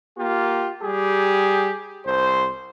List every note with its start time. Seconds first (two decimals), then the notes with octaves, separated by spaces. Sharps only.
0.18 A#3 F4 G4
0.83 G3 G4 G#4
2.06 C2 C5